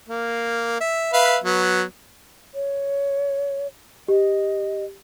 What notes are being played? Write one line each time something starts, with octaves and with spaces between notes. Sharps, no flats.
A#3
E5
B4 E5 F5
F#3 B3
C#5
G4 D#5